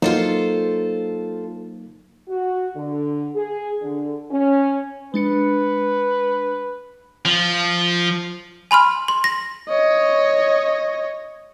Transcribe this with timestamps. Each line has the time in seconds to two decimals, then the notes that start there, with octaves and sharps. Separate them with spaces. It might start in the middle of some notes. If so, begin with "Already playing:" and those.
0.02 F#3 A#3 D#4 F4 A4 C5
2.29 F#4
2.76 D3
3.36 G#4
3.82 D3
4.31 C#4
5.14 G#3 D4 B4 C#7
7.25 F3
8.71 G#5 B5 C6 F6
9.08 C6
9.24 A#6
9.69 C#5 D#5